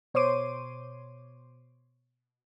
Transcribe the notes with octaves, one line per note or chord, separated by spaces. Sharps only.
B2 C5 C#5 C6 D6 D#7